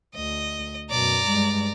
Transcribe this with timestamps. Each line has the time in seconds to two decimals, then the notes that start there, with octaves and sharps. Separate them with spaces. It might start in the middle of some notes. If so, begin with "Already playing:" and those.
0.15 D2 D#5
0.91 F#2 B2 D5 A#5
1.27 G2 G#3